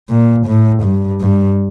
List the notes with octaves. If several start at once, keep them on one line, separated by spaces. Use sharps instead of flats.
A#2
A2
G2
G2